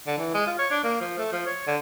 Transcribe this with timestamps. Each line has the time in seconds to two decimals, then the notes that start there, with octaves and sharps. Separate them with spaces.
0.07 D3
0.18 E3
0.34 G#3
0.46 F4
0.59 C#5
0.71 D4
0.84 A#3
1.01 F3
1.18 A3
1.32 F3
1.46 C#5
1.67 D3